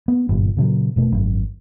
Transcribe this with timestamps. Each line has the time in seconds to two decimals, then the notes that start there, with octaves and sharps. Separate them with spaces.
0.08 B3
0.29 G1 F#2 A#2
0.57 A#2 C#3 E3 F#3
0.96 F1 B2 A3
1.12 G#1 F#2